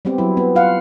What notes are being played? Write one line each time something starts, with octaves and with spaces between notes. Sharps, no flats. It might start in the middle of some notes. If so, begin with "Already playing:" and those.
G3 B3 C4 G4
F#3 E4
B3
F4 F5 F#5